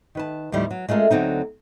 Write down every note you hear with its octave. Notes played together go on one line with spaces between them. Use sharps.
D#3 B4 A5
D#2 A2 F3 G3 A3
F#3
G#3 A3 C#4 F4 A#4
D2 D3 F#3 C4 D#4